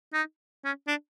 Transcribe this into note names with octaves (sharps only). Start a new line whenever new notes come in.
D#4
C#4
D4